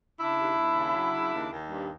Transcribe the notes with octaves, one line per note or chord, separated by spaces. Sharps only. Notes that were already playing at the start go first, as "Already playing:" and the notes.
C#3 D4 E4
D#2
D#2
C#3
F#3
C#3
D#2
D#2
G2